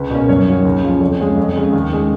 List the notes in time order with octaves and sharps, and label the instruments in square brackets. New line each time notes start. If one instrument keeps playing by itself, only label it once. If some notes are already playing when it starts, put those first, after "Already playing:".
Already playing: [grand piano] C#2 B4
B2 A#3 C#4
F#2 C#5
D#3 F#3 A#3
C#2
C#3 F3
F2 C#5
C#3 G#3
F2
C#3 G#3
D#2
C#3 G#3